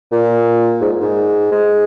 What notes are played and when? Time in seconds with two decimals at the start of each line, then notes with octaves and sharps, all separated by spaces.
0.12 A#2
0.81 G#2
1.00 G#2
1.52 G#3